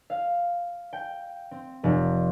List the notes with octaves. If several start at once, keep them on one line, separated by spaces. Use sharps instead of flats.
F5
G5
C4
F1